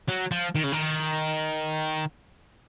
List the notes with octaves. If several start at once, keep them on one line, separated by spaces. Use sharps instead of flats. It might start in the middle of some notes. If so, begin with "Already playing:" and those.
F#3
F3
D#3
C#3
D#3